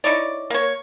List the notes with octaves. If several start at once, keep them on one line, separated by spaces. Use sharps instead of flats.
D#4 E4 C#5 D5
A#3 C#5